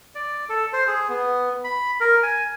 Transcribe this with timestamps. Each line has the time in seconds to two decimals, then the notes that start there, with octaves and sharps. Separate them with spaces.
0.15 D5
0.49 A4
0.73 C5
0.87 G#4
1.09 B3
1.64 B5
2.00 A#4
2.23 G#5